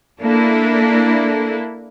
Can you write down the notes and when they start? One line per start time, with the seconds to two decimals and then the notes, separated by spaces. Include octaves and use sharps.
0.22 A#3 D4 E4 A4